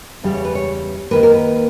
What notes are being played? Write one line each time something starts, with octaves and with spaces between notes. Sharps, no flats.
E2 C#3 G3
C#5
B4
C#5
D#2 D#3 A#3 B4
A#4
B4